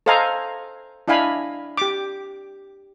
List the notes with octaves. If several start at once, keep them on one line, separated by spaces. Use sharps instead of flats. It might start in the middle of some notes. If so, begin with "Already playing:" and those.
A4 C5 D#5 F5 G#5 A#5
D4 E4 D#5 F5 G#5 B5
G4 D6